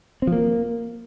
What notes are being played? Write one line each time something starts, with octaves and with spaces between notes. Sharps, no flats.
C4
F3
A#3